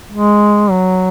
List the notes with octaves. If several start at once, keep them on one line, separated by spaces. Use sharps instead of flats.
G#3
F#3